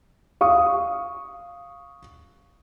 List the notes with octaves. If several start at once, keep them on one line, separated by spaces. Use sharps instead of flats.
F5 C#6 D#6